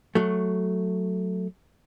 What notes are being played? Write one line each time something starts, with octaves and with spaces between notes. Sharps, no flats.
F#3 A3